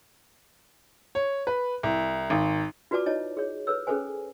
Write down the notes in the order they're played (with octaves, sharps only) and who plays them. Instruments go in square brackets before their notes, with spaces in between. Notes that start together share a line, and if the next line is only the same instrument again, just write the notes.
[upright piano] C#5
B4
C2
G#1
[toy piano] F4 F#4 B4 D5 A5 D6
D#4 E4 C#5 D#5 A5
G#4 C#5
A4 B4 C#5 E6
C#4 G#4 A4 B4 C5 G#5